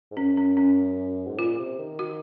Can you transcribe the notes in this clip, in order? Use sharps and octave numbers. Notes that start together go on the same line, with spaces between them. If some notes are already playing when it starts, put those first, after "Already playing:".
G#2
F#2 C#4
C#4
C#4
G#2
A#2 F4
C3
D#3
F#4